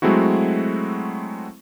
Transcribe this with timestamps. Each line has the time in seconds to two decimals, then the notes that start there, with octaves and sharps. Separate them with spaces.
0.02 F#3 G#3 A3 C4 E4 F#4